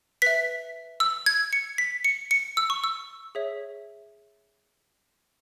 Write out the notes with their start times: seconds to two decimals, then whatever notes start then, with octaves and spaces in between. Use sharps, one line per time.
0.22 B4 E5 B6
1.00 E6
1.26 G#6
1.53 C#7
1.78 B6
2.05 C#7
2.31 C#7
2.57 E6
2.70 C#6
2.84 E6
3.35 G#4 C#5 E5